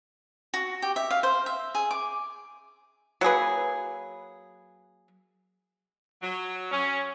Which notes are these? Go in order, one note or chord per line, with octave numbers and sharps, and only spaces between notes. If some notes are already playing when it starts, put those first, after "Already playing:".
F#4
G4
E5
F5
C5
E5
G#4
D6
F#3 A#3 G#4 B4
F#3
C#4